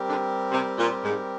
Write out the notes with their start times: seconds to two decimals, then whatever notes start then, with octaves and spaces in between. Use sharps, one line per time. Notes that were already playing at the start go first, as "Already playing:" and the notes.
Already playing: G3 C4 G4 A#4
0.09 D3 D4
0.52 C3
0.78 A#2
1.04 G#2